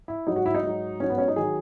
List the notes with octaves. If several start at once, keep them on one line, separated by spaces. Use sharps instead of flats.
E4
G#2 F#3 D#4
F#4
E4
D#4
G#2 F#3
G#2 F#3 C#4
B3
C#4
D#4
D#3 F#3 G#4